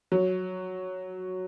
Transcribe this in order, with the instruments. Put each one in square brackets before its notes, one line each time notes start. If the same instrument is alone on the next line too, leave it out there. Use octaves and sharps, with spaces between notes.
[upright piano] F#3